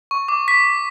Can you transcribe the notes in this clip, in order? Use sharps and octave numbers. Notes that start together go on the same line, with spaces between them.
C#6
D6
B6